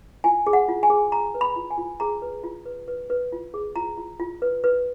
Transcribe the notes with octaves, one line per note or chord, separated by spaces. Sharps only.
F4 G#5
G#4
F#5
F4
G#5
G#4
G#4 A#5
B4
B5
F4
G#5
F4
G#4 A#5
B4
F4
B4
B4
B4
F4
G#4
F4 A#5
F4
F4
B4
B4